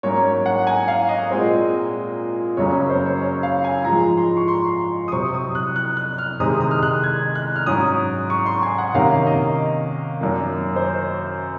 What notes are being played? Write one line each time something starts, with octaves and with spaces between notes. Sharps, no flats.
G#2 F#3 A#3 C#4 C#5
C#5
F#5
G#5
F5
D#5
A#2 G#3 C4
F#2 C#3 F#3 A#3 C#4 C#5
C5
C#5
C#5
F5
G#5
G#2 F3 G#3 A#5
C6
C#6
C6
D#6
C3 F#3 C4 C#6
D#6
F#6
F#6
F#6
F6
C3 D#3 G#3 C4 D#6
D#6
F6
F#6
G#6
F#6
F6
G#2 F#3 C#4 D#6
C#6
C6
G#5
F#5
C3 D#3 A#3 C#4 F5
D#5
F#2 D#3 A#3
C5
C#5